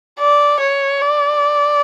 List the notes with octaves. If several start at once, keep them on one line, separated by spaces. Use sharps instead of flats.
D5
C#5
D5